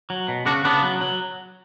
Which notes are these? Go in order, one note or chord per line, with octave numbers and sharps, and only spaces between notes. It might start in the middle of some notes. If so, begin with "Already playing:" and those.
F#3
B2
C#3 D4 F#4
C#3 B3 D4
F#3
F#3